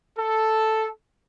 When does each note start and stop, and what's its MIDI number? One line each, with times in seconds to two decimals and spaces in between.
0.18 0.88 69